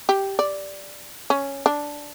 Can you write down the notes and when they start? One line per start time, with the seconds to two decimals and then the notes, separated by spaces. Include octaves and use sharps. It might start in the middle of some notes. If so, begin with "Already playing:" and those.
0.09 G4
0.39 D5
1.30 C#4
1.66 D4